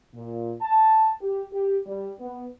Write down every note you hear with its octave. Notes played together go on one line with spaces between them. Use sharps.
A#2
A5
G4
G4
G3
B3